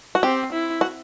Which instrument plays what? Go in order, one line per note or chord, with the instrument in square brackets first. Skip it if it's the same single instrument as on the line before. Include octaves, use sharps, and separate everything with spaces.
[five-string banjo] F#4
[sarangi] C4 [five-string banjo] G4
[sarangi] E4
[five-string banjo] F#4